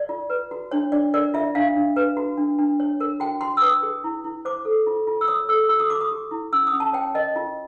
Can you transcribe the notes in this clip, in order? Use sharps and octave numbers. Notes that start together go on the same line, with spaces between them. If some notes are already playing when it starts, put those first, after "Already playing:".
Already playing: D5
F4
B4
F#4
D4 C#5
D4 D5
A#4 D5
F4 E5
D4 F5
D4
B4
F#4
D4
D4
C#5
A#4
F#4 G5
F#4 C6
E6
B4 D#6
G#4
E4
E4
C5 D6
A4
F4
F4
E6
C#5 D#6
A4 E6
F#4 E6
D#6
F#4 D6
D#6
G4
E4
C#4 E6
D#6
C#4
A5
C#5 G5
A#4 D#5
F4